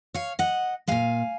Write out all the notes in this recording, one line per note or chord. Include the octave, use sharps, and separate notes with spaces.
C#5 F5
D#5 F#5
A#2 G#3 F5 G#5